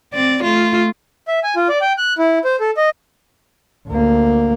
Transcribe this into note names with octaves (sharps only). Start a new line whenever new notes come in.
C4 D5
A3 F4
E5
G#5
F4
D5
G5
F#6
E4
C5
A4
D#5
D2 A#3